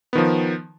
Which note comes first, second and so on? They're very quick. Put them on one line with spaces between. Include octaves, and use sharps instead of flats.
B3 D#3 F3